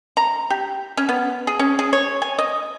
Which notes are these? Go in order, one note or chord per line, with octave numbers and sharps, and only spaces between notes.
A#5
G4
C#4
B3
G#4
C#4
G#4
C#5
G#5
D#5